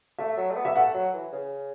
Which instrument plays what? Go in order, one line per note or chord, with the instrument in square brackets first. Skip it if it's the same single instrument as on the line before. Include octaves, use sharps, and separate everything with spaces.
[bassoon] A3 [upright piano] E5
[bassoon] F#3
A3
B3
[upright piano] E5
[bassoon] A3 [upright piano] F#5
[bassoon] F#3
E3
C#3